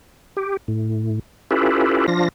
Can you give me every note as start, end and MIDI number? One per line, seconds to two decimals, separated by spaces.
0.37 0.57 67
0.68 1.19 45
1.51 2.06 61
1.51 2.06 64
1.51 2.06 65
1.51 2.06 67
1.51 2.06 69
1.51 2.06 71
2.08 2.28 53
2.08 2.28 62
2.08 2.28 65
2.08 2.28 94